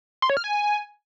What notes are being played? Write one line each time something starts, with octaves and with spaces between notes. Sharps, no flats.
C6
C#5
F6
G#5